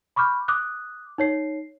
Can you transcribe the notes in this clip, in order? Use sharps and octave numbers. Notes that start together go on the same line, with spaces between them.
B5 C#6 D6 F6 G6
D6 D#6 F#6
D#4 C#5 C7